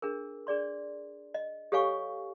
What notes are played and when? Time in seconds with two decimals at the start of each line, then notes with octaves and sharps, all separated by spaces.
0.02 D4 G#4 A#4
0.47 D4 G#4 D5 C6
1.34 D#5
1.72 G4 A4 C#5 F5 G#5 C#6